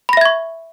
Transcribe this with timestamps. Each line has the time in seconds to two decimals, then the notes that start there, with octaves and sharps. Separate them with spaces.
0.09 B5
0.13 A#6
0.17 E5
0.21 G#6
0.25 C#6